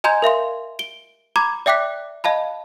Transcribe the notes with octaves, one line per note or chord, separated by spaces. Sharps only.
D#5 G#5 A#5 C6 G6 G#6
A#4 E5 F5 C6
D7 G7
A#5 B5 D6 G#6
D5 E5 G5 D6 F#6 B6
D#5 F5 A5 B5